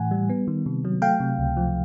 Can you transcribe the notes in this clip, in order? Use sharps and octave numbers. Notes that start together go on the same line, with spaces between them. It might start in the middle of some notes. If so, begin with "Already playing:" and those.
Already playing: A2 E3 F#5 G#5
G3
B3
D#3
C3
F#3
A3 F5 G5
C3
C#2
F3